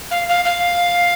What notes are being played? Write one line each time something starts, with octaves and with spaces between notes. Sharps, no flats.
F5
F5
F5